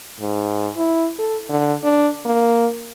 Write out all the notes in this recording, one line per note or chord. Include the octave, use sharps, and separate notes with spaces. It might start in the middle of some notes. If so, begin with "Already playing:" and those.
G#2
E4
A4
D3
D4
A#3